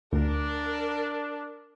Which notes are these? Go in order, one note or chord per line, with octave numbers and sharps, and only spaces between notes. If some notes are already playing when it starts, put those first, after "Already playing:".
D2 D4 A#4